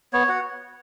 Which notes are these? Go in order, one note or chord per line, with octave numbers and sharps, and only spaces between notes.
B3 C#5
F#4 F#5